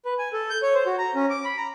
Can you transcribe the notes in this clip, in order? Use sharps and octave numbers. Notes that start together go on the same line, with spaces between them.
B4
G#5
A4
G6
C#5
C5
F#4
A#5
C#4
D6
B5
A#5